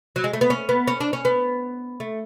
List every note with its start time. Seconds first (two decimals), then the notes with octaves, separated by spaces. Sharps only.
0.16 F#3
0.24 G#3
0.33 A3
0.41 B3
0.50 C#4
0.69 B3
0.88 C#4
1.00 D4
1.13 C#4
1.25 B3
2.00 A3